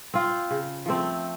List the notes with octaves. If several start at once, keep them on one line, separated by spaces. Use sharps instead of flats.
C4 F4
C#3
F3 A3 C4